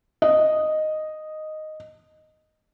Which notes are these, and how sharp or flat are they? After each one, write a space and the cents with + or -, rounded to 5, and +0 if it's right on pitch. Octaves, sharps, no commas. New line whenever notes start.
D#5 -5